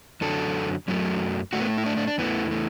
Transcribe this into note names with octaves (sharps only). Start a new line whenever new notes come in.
F#2 D3 F#3 A4
F#2 F#3 A3
A2 A3 F#4
B3
E4
D4
D4
D4
E2 E3 A3 B3
A3